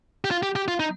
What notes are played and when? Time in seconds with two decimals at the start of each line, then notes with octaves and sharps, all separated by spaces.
0.25 G4
0.31 F4
0.43 G4
0.56 G4
0.68 F4
0.80 D#4